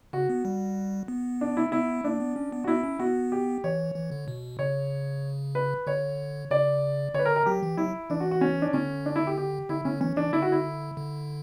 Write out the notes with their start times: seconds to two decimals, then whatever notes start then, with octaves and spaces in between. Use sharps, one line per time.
0.13 C#3 F#4
0.29 B3
0.45 G3
1.08 B3
1.41 D4
1.57 E4
1.72 B3 E4
2.04 A#3 D4
2.20 B3
2.36 C#4
2.52 B3
2.64 F#4
2.68 B3 E4
2.84 C#4
2.99 B3 F#4
3.32 G4
3.64 E3 C#5
3.95 E3
4.12 D3
4.28 B2
4.59 C#3 C#5
5.55 B4
5.87 D3 C#5
6.51 C#3 D5
7.14 D3 B4 C#5
7.25 A#4
7.36 A#4
7.46 F#3 G4
7.63 E3
7.77 F#3 E4
8.10 E3 D4
8.20 F#4
8.31 F#4
8.41 C#4
8.62 D4
8.73 D3 C#4
9.06 D4
9.16 E4
9.27 G4
9.38 G4
9.69 D3 E4
9.85 D3 C#4
10.01 E3 C#4
10.17 E3 D4
10.33 D3 E4
10.42 F#4
10.52 E4
10.97 D3